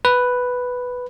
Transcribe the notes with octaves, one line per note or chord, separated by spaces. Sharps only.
B4